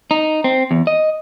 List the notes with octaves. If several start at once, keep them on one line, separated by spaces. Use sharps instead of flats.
D#4
C4
E2
D#5